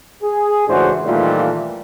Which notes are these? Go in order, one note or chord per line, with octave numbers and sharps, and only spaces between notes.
G#4
C#2 A2 E3 D4 F#4 C5
A#2 D#3 E3 G3 A3 F4